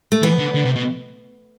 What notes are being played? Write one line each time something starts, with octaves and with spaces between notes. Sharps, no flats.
A3
E3 B3
D3
D3
C3
B2